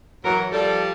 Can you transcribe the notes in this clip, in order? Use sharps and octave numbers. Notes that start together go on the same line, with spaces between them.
E3 F#3 A#4
F3 G3 A4